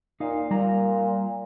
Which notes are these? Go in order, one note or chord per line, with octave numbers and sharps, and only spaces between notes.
A#2 D#4 F5
A#2 G3 A#5